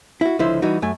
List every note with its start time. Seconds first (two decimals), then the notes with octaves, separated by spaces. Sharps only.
0.21 E4 F#4
0.39 C#2 D3 F3 E4 C5
0.62 E3 G3 D#4 F#4
0.82 F#2 A3 G#5